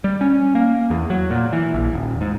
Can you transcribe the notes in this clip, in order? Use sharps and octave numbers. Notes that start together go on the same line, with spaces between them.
G3
C#4
A#3
E2
F#3
A#2
E3
A#1
D#1
G#2